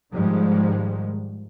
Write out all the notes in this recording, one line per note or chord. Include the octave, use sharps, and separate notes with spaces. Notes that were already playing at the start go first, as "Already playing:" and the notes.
G#2 D#3 F3 G3 G#3